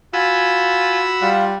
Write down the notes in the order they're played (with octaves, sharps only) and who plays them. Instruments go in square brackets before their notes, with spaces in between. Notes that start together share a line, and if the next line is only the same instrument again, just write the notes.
[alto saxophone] F4 [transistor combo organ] F#4 B5 E6 [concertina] G#5
[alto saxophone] G3 [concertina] F4 F#5